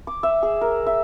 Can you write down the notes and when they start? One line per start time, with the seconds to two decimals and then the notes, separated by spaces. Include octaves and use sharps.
0.07 D6
0.23 E5
0.43 G#4
0.61 A#4
0.86 E5